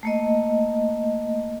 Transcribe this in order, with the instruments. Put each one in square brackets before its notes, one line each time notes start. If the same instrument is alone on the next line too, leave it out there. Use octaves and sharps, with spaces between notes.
[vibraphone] A3 A#3 D#5